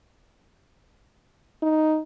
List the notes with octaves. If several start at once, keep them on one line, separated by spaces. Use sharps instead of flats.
D#4